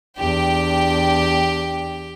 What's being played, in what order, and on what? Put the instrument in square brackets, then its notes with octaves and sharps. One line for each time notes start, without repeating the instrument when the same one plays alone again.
[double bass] E2 D4 [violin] G4 G5